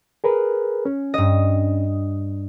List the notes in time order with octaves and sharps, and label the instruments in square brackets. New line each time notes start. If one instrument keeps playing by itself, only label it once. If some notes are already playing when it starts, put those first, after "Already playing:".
[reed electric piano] G#4 A#4 B4
C#4
[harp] G2 D#5